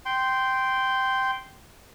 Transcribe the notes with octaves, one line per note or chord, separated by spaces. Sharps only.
G5 C6